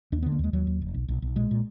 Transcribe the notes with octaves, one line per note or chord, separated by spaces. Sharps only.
D#2 D4
B3
D3
A#3
D#2 G#3
D#2 F#3
D#2
F1
B1
B1
B1
A#2 G#3
A#2